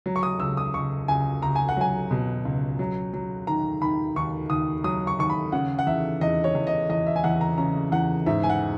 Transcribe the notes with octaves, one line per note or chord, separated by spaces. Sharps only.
F#3
C#6
D#6
C#2 E6
D#6
C#2 C#6
C#2 G#5
C#2 A#5
G#5
F#5
F#3 G#5
B2
C#2
F#3
F#3
D#3 A#5
D#3 B5
D#2 C#6
D#2 D#6
F#3 D#6
C#6
D#2 C#6
B5
C#3 F#5
F#5
E2 E5
E2 D#5
C#5
E2
D#5
E2 D#5
E5
G#5
E2 F#5
A#5
C#3 A#5
E2 F#5
G#2 E5
G#5
F#5